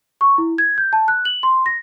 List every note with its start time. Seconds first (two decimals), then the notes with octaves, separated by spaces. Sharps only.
0.21 C#6
0.38 E4
0.58 G#6
0.78 G6
0.93 A5
1.08 F#6
1.25 F#7
1.43 C6
1.66 A#6